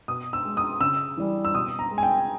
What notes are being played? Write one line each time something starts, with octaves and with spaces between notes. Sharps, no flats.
B2 D#6
E6
G#3
D#6
C#3 E6
E3 G3
E6
B2 D#6
A#5
G#3
G#5
G5